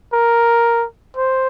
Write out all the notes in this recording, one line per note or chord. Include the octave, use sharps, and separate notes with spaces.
A#4
C5